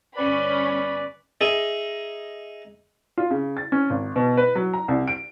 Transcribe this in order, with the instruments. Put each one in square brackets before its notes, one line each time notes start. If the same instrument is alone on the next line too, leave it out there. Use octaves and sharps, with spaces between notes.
[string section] G1 C#4 B5 [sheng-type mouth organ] B4 D5
[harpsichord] D#4 G#4 E5
[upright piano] F4
C#3
A6
C#4
G#1
B2
B4
F#3
A#5
C2
D7